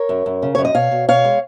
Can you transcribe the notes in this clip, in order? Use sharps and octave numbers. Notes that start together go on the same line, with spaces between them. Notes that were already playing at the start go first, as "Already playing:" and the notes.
Already playing: A#4 C#5
F#2
F#2
C#3
F#2 C#5
D#5
B2 C#5 F5
B2
B2 C#5 F5
G#3